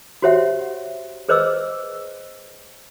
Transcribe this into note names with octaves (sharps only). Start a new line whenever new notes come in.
F#4 G4 C5 C#5 E5 F#5
G#4 B4 C5 D#5 D6 E6